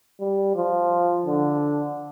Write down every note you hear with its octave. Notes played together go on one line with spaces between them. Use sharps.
G3
F3
D3